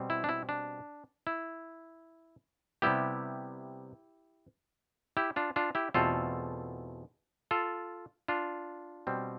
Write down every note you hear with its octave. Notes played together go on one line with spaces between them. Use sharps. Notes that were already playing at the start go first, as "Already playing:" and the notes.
Already playing: B2 G3 C4
E4
D4
E4
D4
E4
C3 G3 B3 E4 G4
E4 G4
D4 F4
D4 F4
E4 G4
E2 B2 A3 C4 F4 A4
F4 A4
D4 F4
B2 G3 C4